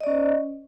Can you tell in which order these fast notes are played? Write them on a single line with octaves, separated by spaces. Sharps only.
D#5 D5 C#4 C5